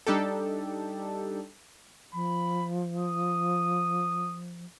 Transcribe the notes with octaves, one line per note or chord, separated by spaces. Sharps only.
G3 D4 D#4 G4 A4
F3 B5
D#6